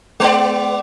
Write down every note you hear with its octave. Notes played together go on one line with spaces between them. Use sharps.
G#3 B3 D5